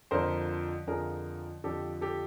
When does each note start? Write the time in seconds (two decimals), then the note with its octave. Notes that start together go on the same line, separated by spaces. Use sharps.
0.11 F2 D3 F3 A#4 C5
0.87 F2 D3 F3 G#4 A#4
1.64 F2 D3 F3 G4 A4
2.01 G4 A4